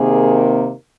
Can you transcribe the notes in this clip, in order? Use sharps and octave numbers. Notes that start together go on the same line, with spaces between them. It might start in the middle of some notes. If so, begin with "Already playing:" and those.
Already playing: C3 D#3 A#3 G#4